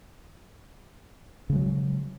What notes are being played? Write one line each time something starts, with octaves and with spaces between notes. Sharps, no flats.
C#3 F#3 G#3